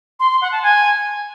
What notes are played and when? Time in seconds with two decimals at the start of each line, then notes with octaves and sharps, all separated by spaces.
0.20 C6
0.31 C6
0.41 F#5
0.52 A5
0.63 G#5